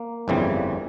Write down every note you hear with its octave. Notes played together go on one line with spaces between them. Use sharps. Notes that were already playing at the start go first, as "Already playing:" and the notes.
Already playing: A#3
G1 F2 C#3 E3 G3